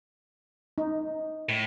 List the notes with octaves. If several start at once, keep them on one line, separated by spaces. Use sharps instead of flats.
D#4
A2